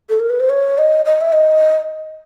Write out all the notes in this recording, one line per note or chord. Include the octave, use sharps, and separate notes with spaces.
A4
A#4
B4
C5
C#5
D#5
D#5
E5
D#5